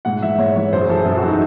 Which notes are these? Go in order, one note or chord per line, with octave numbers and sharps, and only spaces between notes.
G#2 F#5
E3 E5
G#2 C#5
E3 C#5
F#2 C5
G#4
E3 A4
F#2 G#4
F#4
E3
D#4